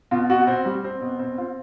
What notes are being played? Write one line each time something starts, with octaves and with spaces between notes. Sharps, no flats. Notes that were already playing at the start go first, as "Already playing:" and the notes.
B2 F4
B2 F#4
C4
G3
C4
B2
C4
C4 F4